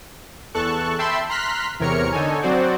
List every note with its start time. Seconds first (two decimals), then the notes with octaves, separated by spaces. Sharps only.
0.54 E2 A4 A5 C#6 F#6
0.99 E5 G5 A5 B5 C6 E6
1.29 A#5 C6 F6 F#6 B6
1.80 E2 C3 A#4 C#5 F6 C#7
2.12 D3 D#4 A4 C#5 G#5
2.42 F#3 C4 F#4 C5 D5